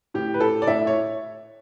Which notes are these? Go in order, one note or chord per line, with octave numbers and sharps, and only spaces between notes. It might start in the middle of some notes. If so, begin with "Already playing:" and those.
A2 G4
B4
A2 A4
D5
A2 E5
C#5